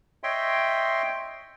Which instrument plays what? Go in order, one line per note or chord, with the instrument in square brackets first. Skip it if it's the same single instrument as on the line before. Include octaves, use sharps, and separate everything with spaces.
[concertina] C#5 D#5 E5 G5 C6